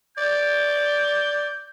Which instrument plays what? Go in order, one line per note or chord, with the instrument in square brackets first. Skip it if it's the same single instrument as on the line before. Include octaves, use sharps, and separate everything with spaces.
[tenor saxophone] D5 [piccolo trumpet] G6